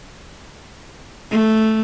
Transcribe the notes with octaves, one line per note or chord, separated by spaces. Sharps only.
A3